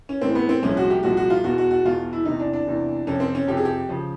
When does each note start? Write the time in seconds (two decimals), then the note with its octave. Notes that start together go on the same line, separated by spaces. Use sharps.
0.09 C#4
0.22 A2 E3 G#3 C4
0.35 B3
0.49 C4
0.62 C2 A#2 F3 G#3 C#4
0.77 F#4
0.90 G4
1.03 C2 A#2 F3 G#3 F#4
1.17 F#4
1.30 F4
1.44 E2 B2 G#3 F#4
1.58 F#4
1.71 F#4
1.85 E2 B2 G#3 F4
2.13 E4
2.25 E2 C3 E3 D#4
2.40 D4
2.53 D4
2.66 E2 C3 E3
3.07 F2 C3 F3 C#4
3.20 C4
3.35 C#4
3.47 F2 C3 F3 G4
3.57 G#4
3.65 G4
3.89 C#3 F3